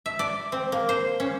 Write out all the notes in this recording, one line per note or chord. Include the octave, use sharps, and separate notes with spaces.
E5
D5
C4
A#3
C5
C#4